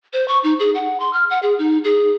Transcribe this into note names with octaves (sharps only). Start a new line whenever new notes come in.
C5
C#6
D#4
G#4
F#5
C6
F6
F#5
G#4
D#4
G#4